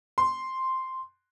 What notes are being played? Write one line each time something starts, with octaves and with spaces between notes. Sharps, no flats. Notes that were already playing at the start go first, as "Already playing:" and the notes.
C6